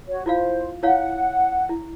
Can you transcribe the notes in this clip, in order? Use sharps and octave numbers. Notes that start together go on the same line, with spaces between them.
F#4 C#5
E4 F4 C5 F5
E4 C#5 F5 F#5
E4